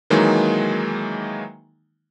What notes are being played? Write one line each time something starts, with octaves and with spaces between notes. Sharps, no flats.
D#3 E3 F#3 G#3 A#3 D#4